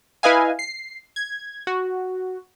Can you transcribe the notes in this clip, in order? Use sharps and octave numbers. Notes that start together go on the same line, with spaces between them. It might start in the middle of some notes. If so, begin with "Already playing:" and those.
E4 B4 D#5 F5 G#5
C7
G#6
F#4